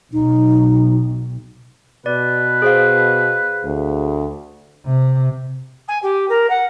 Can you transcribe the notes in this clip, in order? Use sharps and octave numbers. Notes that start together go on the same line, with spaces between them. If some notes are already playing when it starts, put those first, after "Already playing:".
B1 D#4
B2 B4 D5
G#4 C5 F5
D2
C3
G#5
G4
A#4
F#5